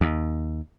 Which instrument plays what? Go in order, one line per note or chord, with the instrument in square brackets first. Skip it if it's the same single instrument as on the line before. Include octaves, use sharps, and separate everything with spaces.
[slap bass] D#2